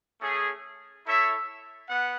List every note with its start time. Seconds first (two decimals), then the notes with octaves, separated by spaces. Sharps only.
0.21 A3 C#4 G#4
1.05 E4 A4 C#5 E5
1.88 B3 F#5